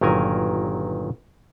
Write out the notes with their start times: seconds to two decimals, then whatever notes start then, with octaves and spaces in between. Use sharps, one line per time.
0.01 G1 A#2 D#3 F#3 A#4 G#5